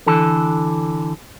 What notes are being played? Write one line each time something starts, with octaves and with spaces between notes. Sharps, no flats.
D3 E3 A4